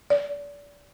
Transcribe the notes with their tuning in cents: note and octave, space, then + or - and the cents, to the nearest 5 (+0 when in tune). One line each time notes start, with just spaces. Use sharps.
D5 -30